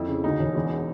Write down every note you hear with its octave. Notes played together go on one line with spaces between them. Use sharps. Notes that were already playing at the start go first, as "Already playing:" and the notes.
Already playing: F2 E4
C#3
D2 D#4
E1
E2